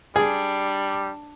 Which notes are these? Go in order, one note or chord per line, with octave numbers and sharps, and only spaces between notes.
G3 D4 G#4